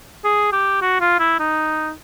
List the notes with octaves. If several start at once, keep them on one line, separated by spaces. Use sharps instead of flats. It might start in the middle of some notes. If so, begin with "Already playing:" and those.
G#4
G4
F#4
F4
E4
D#4